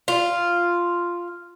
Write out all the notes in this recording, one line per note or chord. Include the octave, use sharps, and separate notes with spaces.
F4